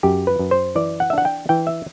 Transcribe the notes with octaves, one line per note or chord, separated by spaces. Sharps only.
F#2 G4
B4
F#2
C5
E3 D5
F#5
E5
D4 F#5
G5
E3 G5
E5